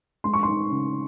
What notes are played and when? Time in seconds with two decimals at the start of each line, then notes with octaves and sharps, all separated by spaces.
0.24 G#3 C6
0.33 C#6
0.43 D#4 C6
0.71 C#3